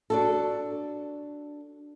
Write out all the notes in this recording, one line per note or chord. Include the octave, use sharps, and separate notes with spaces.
D4 F#4 A4